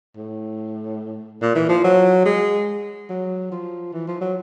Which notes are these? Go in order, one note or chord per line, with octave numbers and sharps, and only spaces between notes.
A2
A#2
E3
F3
F#3
G#3
F#3
F3
E3
F3
F#3